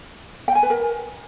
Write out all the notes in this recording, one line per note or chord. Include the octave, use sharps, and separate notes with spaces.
G5
G#5
B4
A#4